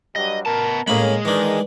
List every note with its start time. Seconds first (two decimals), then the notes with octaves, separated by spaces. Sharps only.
0.16 G2 F#3 G3 D#5
0.46 B3 A#4 A5
0.88 A2 G#3 A#3 C#4 G#4 B5
1.25 D#3 E3 D4